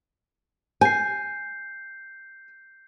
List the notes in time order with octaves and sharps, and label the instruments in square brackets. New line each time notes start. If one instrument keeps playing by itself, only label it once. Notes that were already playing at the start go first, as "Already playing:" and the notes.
[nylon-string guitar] G#5 [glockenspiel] G6 C7